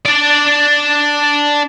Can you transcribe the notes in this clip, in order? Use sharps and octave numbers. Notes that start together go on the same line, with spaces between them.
D4 D5